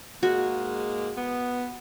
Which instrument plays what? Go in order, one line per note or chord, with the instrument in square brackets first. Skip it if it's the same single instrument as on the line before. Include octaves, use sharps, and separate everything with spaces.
[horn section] G#2 G#3 A#3 [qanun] F#4
[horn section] B3